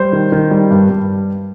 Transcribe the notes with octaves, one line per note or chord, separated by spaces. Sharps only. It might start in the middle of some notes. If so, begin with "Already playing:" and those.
Already playing: G3 C5
D#3
D#3
G3
G2
G2